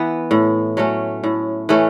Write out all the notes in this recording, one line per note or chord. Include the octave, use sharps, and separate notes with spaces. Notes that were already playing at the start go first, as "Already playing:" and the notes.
Already playing: E3 B3
A2
F#3 A3 C#4
A2
E3 A3 C#4